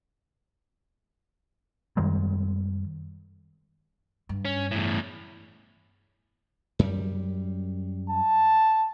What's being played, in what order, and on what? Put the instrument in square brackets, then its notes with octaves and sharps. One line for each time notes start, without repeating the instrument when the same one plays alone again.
[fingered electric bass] F#2 D#3 G3 G#3
[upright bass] G2
[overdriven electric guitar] C#4
E2 A2
[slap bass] F#2 G3
[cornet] A5